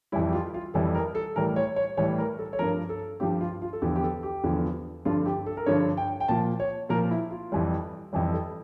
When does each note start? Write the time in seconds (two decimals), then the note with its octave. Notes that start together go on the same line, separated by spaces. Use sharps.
0.12 F2 E3 G3 E4
0.28 G4
0.33 F4
0.54 F4
0.74 F2 E3 G3 A4
0.95 A#4
1.15 A4
1.36 A2 E3 G3 A#4
1.56 C#5
1.76 C#5
1.97 A2 E3 G3 C#5
2.18 A#4
2.39 A4
2.53 C#5
2.59 G2 F3 A#4
2.89 A4
3.20 G2 F3 G4
3.41 F4
3.62 F4
3.73 A4
3.82 E2 D3 F3 G4
3.96 G4
4.03 A4
4.23 G4
4.44 E2 D3 F3
5.05 G2 D3 F3 F4
5.26 G4
5.46 A4
5.57 A#4
5.66 G2 D3 F3 C#5
5.97 G5
6.20 G5
6.28 A#2 F3 A5
6.60 C#5
6.89 A#2 F3 A#4
7.11 E4
7.31 F4
7.52 F2 E3 G3
8.13 F2 E3 G3 G4
8.33 A4